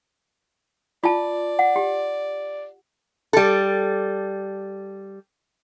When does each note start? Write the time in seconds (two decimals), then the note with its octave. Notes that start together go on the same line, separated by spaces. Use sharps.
1.04 F4 D5 A5
1.59 F#5
1.76 G4
3.33 G3 A4